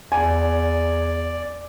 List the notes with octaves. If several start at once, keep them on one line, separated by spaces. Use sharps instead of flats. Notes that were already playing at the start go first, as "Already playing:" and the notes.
E2 D5 G#5